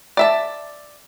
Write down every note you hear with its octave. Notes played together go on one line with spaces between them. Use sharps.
D5 E5 A5